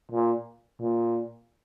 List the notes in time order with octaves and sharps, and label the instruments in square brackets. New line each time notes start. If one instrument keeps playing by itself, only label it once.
[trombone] A#2
A#2